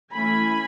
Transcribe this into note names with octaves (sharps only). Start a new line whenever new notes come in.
E3 A3 C#4 G#5 B5